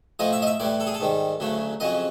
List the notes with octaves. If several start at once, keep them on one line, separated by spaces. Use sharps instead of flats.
A2 F3 A3 D#5
E5
D#5
E5
A2 E3 G3 D5
A4
G#4
A4
G#2 D#3 G3
D2 C#3 F#3 A3
F2 C#3 F#3 D#5